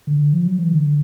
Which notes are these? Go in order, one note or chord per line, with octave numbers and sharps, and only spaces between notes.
D3
F3
F#3
E3
D3